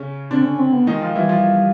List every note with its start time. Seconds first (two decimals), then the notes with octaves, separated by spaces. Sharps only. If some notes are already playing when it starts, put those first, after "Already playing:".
Already playing: C#3 C#4
0.31 D3 C4 D4
0.45 C#4
0.59 C4
0.73 B3
0.87 D#3 G#3 D#4
1.01 F3 F4
1.15 E3 G3 E4
1.29 F3 F4